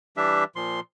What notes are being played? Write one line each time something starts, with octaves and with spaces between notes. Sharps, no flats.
E3 G3 D4 G4 E5
A#2 F3 C6